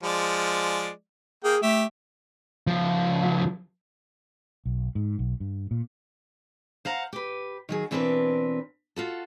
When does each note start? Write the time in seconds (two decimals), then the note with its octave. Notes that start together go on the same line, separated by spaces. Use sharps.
0.03 F3 G#3 D5
1.44 A#3 G#4 G5
1.63 A3 G4 E5
2.67 C#2 F3
4.66 B1
4.95 G#2
5.19 B1
5.40 G2
5.71 A#2
6.85 C5 F5 F#5 A#5
7.13 G4 B4
7.69 D#3 F#3 G#4
7.91 B2 E3 C4 D4 A#4 B4
8.96 F4 F#4 A4